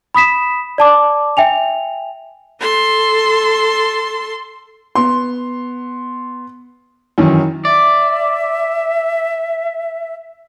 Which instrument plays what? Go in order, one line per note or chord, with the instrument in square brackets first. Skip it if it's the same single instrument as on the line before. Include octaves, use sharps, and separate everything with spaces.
[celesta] B5 D#6 B6 E7
D5 A5 D6
E5 G5 G#5 F7
[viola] A4 C6
[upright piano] B3 C6
F#2 D#3 E3
[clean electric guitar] D5 [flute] E5